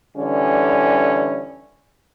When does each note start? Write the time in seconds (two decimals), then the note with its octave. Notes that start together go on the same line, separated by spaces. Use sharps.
0.16 D3 E3 G3 C#4